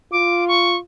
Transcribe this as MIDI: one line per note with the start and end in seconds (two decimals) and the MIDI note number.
0.12 0.78 65
0.12 0.47 86
0.48 0.76 85